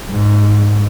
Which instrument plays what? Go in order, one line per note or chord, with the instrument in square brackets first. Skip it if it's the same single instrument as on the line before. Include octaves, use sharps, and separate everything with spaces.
[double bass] G#2